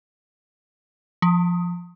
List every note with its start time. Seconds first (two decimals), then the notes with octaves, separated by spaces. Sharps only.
1.22 F3